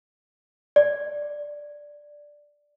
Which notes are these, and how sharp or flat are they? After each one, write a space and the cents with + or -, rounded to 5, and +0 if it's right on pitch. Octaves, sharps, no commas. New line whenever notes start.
D5 +0